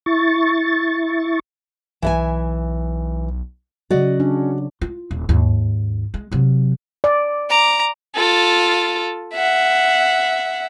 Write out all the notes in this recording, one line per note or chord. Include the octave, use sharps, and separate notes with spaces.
E4 C#6 A6
B1 E3 E5 G#5
C#3 F#3 F#4 D5 D#5
C#4 D4
F4
D#1
D#2 G#2
G#3
C3 F#3
D5
A#5 D6
F4 A4
E5 F#5